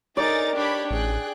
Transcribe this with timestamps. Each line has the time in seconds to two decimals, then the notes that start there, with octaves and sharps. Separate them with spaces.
0.17 D#4 G#4 A#4 D5 A#5 A6
0.55 D4 G4 C#5 B5
0.91 A1 G#4 G5 F#6